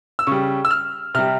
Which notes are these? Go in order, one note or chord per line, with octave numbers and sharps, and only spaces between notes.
E6
C#3 G3 C#6
E6
F6
C3 G3 F6